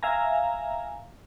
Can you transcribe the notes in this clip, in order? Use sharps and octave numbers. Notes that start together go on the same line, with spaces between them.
E5 F5 G#5 A#5